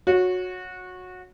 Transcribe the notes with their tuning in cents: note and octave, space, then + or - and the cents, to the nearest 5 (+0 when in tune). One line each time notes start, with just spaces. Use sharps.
F#4 -20 C#5 +0